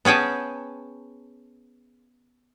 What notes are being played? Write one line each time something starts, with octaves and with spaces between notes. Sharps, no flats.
B3 C#4 G#4 G5 A5